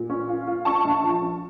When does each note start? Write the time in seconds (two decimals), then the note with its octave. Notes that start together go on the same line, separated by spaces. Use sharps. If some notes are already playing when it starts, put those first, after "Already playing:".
Already playing: A#2
0.10 C#4
0.29 F4
0.47 F4
0.65 C#4 A5 C#6
0.84 A#1
1.03 F3
1.22 C#4